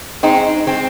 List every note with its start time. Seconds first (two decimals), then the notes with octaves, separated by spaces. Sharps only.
0.23 G#3 C4 D#4
0.66 G#3 C4